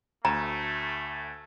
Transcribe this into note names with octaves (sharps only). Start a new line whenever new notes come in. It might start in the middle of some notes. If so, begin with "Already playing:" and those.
D2 A3 A#5